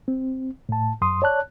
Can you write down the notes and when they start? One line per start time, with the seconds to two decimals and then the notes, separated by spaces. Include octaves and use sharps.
0.08 C4
0.69 A2 A5
1.02 F#2 C6 D#6
1.22 C#5 D5 A5 F#6